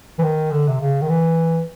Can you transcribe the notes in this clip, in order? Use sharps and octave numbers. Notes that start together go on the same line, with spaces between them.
E3
D#3
D3
C3
C#3
D#3
E3